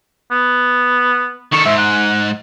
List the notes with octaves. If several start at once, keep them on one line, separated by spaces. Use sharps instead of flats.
B3
D#3 A4 C#6
G#2 E5
F#5